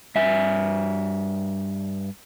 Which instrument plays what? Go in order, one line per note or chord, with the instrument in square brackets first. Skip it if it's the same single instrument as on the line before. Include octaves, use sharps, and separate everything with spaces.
[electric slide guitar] G2 E5 G#5